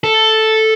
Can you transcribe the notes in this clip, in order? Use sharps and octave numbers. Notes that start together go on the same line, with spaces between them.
A4